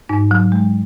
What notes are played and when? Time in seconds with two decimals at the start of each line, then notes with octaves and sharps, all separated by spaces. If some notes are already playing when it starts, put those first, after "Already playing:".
0.09 G#2 D#4
0.31 F#3
0.52 G#3